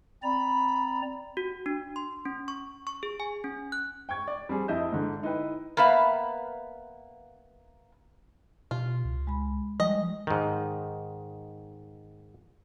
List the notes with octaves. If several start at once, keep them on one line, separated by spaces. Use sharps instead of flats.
C4 D5 A#5 B5
F#4
D4
C6
C#4
C#6
C#6
G#4
G#5
C#4
F#6
G5 C#6 G#6
D5
G3 C4 G#4
F2 E4 D#5 E5 G6
G#2 D3
D#4 E4 B4 G5
A#3 B3 B4 E5 F5
B2 F4 G4
C#2
G#3 B5
F3 G3 G#3 D#5
G#2 D#3